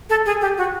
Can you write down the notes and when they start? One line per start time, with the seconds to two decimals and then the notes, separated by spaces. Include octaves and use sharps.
0.10 A4
0.26 G#4
0.41 G4
0.58 F#4